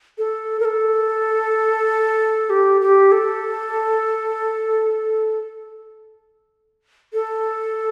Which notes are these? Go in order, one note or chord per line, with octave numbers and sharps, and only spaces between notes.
A4
A#4
A4
G4
G4
A4
A4